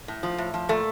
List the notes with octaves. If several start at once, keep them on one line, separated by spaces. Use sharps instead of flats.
A2
F3
A2
F3
A#2 A3